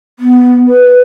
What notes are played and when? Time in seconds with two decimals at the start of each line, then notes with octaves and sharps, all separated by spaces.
0.19 B3
0.67 B4